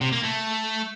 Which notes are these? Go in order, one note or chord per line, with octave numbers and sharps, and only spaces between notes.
C3
A#3
A3